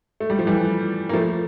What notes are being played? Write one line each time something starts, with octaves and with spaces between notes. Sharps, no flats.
A3
G3
F3
E3 G3
A#3
F3 A3